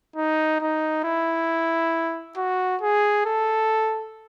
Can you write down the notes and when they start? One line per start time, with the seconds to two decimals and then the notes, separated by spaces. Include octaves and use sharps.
0.16 D#4
0.60 D#4
1.04 E4
2.37 F#4
2.82 G#4
3.26 A4